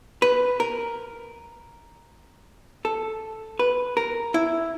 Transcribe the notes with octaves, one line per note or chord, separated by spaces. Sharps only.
B4
A#4
A4
B4
A#4
E4